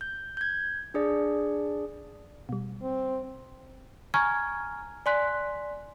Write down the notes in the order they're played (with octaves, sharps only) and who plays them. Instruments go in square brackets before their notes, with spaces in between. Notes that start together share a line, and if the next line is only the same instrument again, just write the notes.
[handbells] G6
G6 G#6
D4 G#4 D5
[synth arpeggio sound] B2 G3
[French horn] C4
[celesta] G#5 A#5 C#6 F6 G#6
D5 G#5 C6 F#6 B6